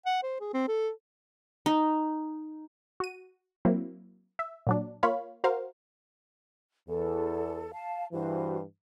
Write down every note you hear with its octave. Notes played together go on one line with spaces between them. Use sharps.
F#5
C5
G#4
C4
A4
D#4
F#4 D#7
F#3 A#3 C4 E4
E5
A#2 F#3 D4
A#3 F4 C#5 F5 B5
F#4 A#4 C5 F5
E2 A4
F5 A5
G2 E3 F#4 C5